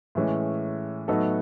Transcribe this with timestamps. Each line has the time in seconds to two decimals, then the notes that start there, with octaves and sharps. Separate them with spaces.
0.15 A2 E3 G#3 C#4
1.08 A2 F#3 B3 D#4 A4